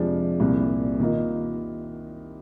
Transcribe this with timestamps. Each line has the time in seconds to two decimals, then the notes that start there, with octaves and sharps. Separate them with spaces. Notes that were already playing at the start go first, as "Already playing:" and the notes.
Already playing: F2 C3 F3 G#3 D4
0.40 C2 A#2 G3 A#3
1.00 D#3 A#3 F4 A#4 D#5